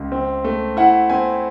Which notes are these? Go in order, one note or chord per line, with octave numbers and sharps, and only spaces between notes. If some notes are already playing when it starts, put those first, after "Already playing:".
Already playing: C#2
C4
A3
E4 F#5
C4 G#5